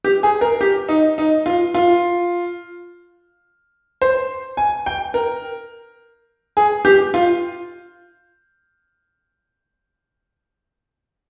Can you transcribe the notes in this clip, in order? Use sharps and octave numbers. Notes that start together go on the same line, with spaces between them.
G4
G#4
A#4
G4
D#4
D#4
F4
F4
C5
G#5
G5
A#4
G#4
G4
F4